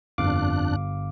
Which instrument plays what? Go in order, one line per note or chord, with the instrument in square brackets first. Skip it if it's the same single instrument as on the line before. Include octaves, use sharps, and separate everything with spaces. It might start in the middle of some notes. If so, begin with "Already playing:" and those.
[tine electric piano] G1 F5 D6 [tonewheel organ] F2 D4 F#6